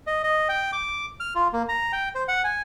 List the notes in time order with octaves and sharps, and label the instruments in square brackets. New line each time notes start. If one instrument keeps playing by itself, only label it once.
[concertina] D#5
D#5
G5
D6
F6
F4
A#3
A#5
G5
C5
F#5
G#5